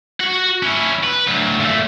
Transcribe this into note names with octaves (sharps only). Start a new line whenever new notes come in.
F#4 F#5
C#4 E4
B4
D2 F#3
A#2 A3